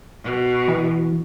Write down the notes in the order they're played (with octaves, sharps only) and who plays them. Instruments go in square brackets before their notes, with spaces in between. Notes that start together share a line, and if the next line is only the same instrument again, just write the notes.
[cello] B2
[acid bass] E3